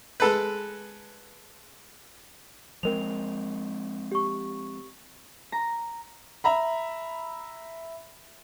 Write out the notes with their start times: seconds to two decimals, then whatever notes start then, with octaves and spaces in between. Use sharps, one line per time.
0.20 G#3 A4 B4
2.83 F3 G#3 C4 A#4 F7
4.12 G4 C#6
5.52 A#5
6.44 E5 A#5 B5